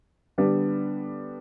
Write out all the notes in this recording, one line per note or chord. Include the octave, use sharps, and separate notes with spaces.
D3 G3 B3 D4